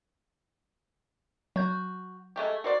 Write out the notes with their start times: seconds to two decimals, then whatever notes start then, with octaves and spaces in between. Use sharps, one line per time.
1.56 F#3 F#4 G6
2.36 G#3 A3 G4
2.64 F#4 C5 D5